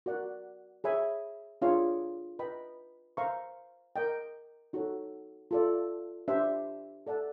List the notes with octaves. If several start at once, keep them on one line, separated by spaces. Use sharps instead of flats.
F#4 A#4 D5 F#5
G#4 C#5 E5 G#5 B5
D4 F4 G#4 C#5 F5
B4 D#5 G5 B5
C5 F5 A#5 C#6
A#4 D#5 G5
D#4 F#4 A4 C#5
F4 A4 D5
D4 G4 C5 E5
A4 D5 F#5 A5